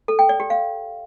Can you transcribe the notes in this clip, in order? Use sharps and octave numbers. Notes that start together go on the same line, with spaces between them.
A4
G5
D5
G4
F5